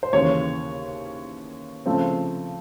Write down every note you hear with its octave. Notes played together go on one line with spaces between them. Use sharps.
C5
D#2 C#3 E3 C#5
C#3 F3 A3 C4